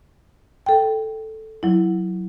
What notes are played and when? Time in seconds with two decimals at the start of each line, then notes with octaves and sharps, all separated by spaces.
0.66 A4 G5
1.63 F#3 E4